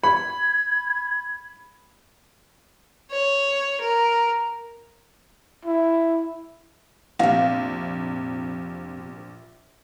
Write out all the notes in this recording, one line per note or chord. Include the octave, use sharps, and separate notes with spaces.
B5 G#6
C#5
A#4
E4
A#1 F2 C3 F5